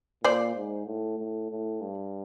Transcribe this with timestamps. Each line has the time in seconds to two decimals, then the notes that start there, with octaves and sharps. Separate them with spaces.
0.24 A#2 C5 D5
0.56 G#2
0.86 A2
1.19 A2
1.50 A2
1.81 G2